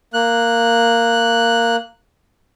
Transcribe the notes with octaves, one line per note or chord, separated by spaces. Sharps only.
A#3 F#6